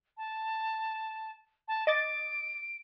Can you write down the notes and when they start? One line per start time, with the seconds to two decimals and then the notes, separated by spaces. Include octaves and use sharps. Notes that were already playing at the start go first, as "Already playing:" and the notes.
0.17 A5
1.68 A5
1.87 D#5 D6 A6 D7